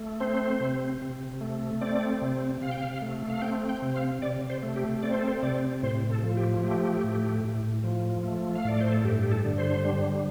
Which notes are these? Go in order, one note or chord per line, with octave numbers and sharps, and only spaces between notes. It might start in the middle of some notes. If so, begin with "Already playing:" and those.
Already playing: A3
C4 C5
C3
C3
A3
C4 D5
C3
C3 F5
G5
F5
A3
F5
C4 G5
G5
C3
F5
C3 D5
C5
A3
G4
C4 D5
C5
A4
C5
C3 D5
A2 C5
A4
F3
G4
A3 G4
A2
A2
F3
A3
F5
A2 D5
C5
A4
G2 G4
G4
A4
D3
C5
G3